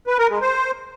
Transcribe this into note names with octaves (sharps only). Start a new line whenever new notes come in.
B4
A#4
G#3
C5